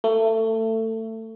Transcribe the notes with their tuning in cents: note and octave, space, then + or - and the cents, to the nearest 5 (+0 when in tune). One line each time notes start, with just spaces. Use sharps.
A3 +25